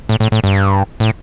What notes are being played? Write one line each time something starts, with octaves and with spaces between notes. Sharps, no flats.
A2
A2
A2
G2
A2